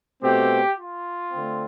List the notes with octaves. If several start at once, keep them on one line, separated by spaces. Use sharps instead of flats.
B2 A3 C4 G4
F4
D3 A3 C4